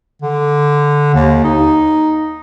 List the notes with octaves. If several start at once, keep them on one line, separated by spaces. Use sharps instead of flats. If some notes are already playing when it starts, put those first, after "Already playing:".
D3
D#2
D#4